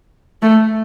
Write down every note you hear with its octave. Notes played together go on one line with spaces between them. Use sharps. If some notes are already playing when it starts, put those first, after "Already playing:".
A3